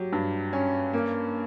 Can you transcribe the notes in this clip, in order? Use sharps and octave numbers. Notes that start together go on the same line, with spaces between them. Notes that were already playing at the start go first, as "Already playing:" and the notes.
Already playing: F#3 G4
G2
C#4
A#3